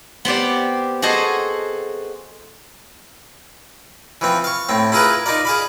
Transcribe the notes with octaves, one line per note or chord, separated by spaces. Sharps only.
B3 C4 G4 D5
F#4 G#4 A4 C5 D#5
E3 F3 C4
F5 C#6
A2 C4
E4 F4 G#4 A#4 B4
D#4 F4 A#4 D5
G#4 F5 B5